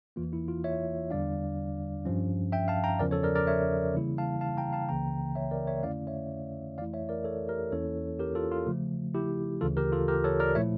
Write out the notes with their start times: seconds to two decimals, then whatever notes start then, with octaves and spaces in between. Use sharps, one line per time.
0.16 E2 E3 A#3 F4
0.33 E4
0.48 F4
0.64 C#5 E5
1.10 E2 D3 G3 D4 D5 F5
2.05 G2 F3 C#4
2.52 E5 G5
2.68 F5 A5
2.84 G5 A#5
2.99 E2 C#3 F3 C#4 A#4 D5
3.11 A4 C#5
3.23 A#4 D5
3.35 A#4 D5
3.47 C#5 E5
3.94 C#3 E3 G3 A#3 E4
4.18 F5 A5
4.41 F5 A5
4.57 G5 A#5
4.73 F5 A5
4.89 C#2 C#3 E3 A#3 G5 A#5
5.36 C#5 E5
5.51 A#4 D5
5.67 C#5 E5
5.83 F2 D3 A3 C#4 E4 D5 F5
6.07 C#5 E5
6.78 F2 E3 A3 E4 D5 F5
6.94 C#5 E5
7.09 A#4 D5
7.24 A4 C#5
7.48 G4 A#4
7.72 E2 E3 A#3 C#4 E4 A4 C#5
8.19 G4 A#4
8.35 F4 A4
8.52 F4
8.67 C#3 F3 A3
9.15 E4 G4
9.61 D2 C#3 E3 F4 A4
9.77 G4 A#4
9.92 F4 A4
10.08 G4 A#4
10.24 A4 C#5
10.40 A#4 D5
10.55 A#2 F3 A3 E4 C#5 E5